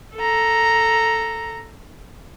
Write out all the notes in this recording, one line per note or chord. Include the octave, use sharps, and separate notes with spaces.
A4 A#5